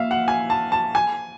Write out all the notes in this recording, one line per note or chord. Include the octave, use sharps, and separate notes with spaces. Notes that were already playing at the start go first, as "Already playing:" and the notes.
Already playing: A#3 E5 F5
F#5
G#5
A5
A5
G#5